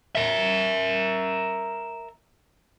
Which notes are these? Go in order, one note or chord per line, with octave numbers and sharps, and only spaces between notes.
A#4 E5